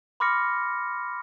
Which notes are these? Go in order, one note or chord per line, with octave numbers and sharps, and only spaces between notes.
B5 C6 D6 F6 A#6 C#7